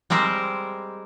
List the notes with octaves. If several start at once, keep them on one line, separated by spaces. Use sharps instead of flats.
G3 G#3 C4 A#4 C5